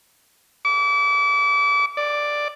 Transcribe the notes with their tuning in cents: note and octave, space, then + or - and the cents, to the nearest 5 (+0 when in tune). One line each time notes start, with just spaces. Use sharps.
D6 -35
D5 +5